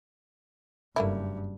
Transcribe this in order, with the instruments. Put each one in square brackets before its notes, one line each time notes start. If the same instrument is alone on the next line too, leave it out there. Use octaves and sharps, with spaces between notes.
[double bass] F#1 G2 [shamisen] A3 A#3 E4